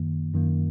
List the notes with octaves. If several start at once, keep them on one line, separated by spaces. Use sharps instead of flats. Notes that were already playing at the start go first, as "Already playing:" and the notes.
Already playing: F#2 D#3 A#3
F#2 D#3 A#3